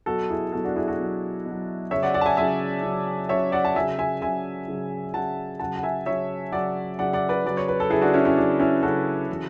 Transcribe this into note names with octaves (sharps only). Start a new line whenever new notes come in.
B2 F#3 F#4 A4
E4 G#4
B2 F#3 F#4 A4
D4 F#4
E4 G#4
F#4 A4
B2 F#3
B2
F#3
C#3 F#3 C#5 E5
D5 F#5
D5 F#5
A5
E5 G#5
C#3 F#3 E5 G#5
C#3 F#3
C#3 F#3 C#5 E5
D5 F#5
A5
C#3 F#3 E5 G#5
E5 G#5
C#3 F#3 E5 G#5
C#3 F#3
C#3 F#3 F#5 A5
C#3 F#3 F#5 A5
F#5
E5 G#5
C#3 F#3 C#5 E5
C#3 F#3 D5 F#5
C#3 F#3 D5 F#5
D5 F#5
B4 D5
C#3 F#3 D5
C#5
B4
A4
C#3 F#3 E4 G#4
D4 F#4
C#4 E4
C#4 E4
C#3 F#3 D4
C#4 E4
C#3 F#3 F#4 A4
C#3 E3